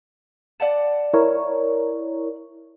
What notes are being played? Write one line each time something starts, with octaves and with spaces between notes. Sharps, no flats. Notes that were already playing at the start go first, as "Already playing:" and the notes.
D5 F#5 A5
E4 A#4 C#5